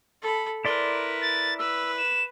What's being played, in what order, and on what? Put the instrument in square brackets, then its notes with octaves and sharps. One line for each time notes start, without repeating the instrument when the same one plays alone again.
[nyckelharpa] A4 B5
[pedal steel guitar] E4 D5 C6 [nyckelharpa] A#4 B4
[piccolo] A6
[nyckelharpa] B4 [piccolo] E6
[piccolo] E7